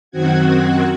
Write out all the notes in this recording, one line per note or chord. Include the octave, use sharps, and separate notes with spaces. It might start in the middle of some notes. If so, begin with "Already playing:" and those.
F#2 D#3 C4 F#4 F#5 G#6